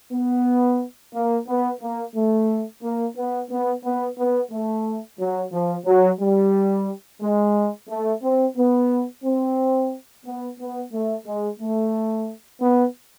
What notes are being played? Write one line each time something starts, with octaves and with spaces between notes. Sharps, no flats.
B3
A#3
B3
A#3
A3
A#3
B3
B3
B3
B3
A3
F#3
F3
F#3
G3
G#3
A3
C4
B3
C4
B3
B3
A3
G#3
A3
B3